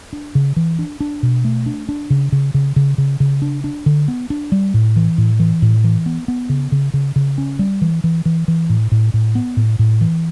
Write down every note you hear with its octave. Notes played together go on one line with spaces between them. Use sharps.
D4
C#3
E3
D4
D4
B2
A3
D4
D4
C#3
C#3
C#3
C#3
C#3
C#3
D4
D4
D3
B3
D4
G3
A2
E3
A2
E3
A2
E3
B3
B3
C#3
C#3
C#3
C#3
C#4
G3
E3
E3
E3
E3
A2
A2
A2
B3
A2
A2
E3